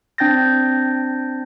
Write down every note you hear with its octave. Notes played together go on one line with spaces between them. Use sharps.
C4 D4 G5 G6 A6 A#6